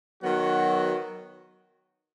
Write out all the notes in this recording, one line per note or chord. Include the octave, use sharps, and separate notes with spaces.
D#3 F#3 B3 F#4